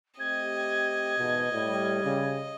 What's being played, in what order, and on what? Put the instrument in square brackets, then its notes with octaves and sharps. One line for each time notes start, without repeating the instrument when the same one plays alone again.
[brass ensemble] A3 C4 G4 [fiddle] D#5 [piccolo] G#6
[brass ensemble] E2 G#2 [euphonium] B2
[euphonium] A2 [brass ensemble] G3
[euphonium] C#3